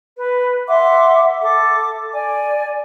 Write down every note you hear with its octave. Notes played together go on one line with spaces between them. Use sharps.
B4
E5 F#5 C6 D6
A4 D6
D5 G#5